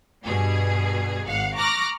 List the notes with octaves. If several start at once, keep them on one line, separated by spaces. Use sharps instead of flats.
G2 B2 G#4
G#1 F5 F#5
A#5 C#6 D6 F6 F#6 A#6